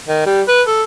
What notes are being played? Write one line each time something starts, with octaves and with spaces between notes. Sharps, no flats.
D#3
G3
B4
A4